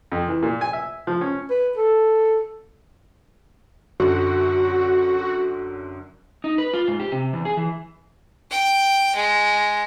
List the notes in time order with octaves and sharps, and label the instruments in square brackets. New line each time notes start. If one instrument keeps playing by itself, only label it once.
[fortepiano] F2
E3
A#2
G#5
E5
F3
C#4
[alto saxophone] B4
A4
[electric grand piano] F#2 D3 F#3 [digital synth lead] F#4
[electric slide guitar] D#4
B4
F4
G#2
G4
C3
E2
G#4
E3
[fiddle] G5
G#3